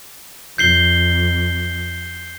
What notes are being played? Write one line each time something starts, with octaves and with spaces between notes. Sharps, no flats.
F2 G6 C7 G7